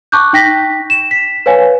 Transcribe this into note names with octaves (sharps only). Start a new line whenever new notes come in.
A5 C#6 D6 F#6 G6
D#4 G5 A#6 B6
E7
B6
B4 C#5 F5 G#5